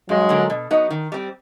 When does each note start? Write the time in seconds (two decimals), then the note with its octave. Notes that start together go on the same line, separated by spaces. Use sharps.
0.09 G2 F#3 G#3
0.29 D3 F3 A#3
0.50 B2
0.71 F#3 B3 D#4
0.91 D#3
1.12 G3 C4